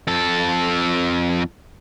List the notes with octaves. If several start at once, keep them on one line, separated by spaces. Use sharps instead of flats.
F2 A4